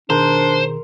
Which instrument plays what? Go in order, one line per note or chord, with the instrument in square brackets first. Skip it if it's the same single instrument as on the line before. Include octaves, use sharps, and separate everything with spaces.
[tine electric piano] B2 D#3 G#4 [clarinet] D4 [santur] A#4 C6 [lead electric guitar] C5